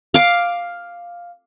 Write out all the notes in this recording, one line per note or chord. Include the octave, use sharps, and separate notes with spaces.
F5 D6